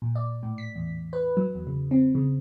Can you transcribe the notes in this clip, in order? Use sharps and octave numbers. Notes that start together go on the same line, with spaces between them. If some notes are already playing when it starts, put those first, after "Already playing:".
A#2
D5
A2
B6
E2
B4
F#3
E2
C#3
C4
C#3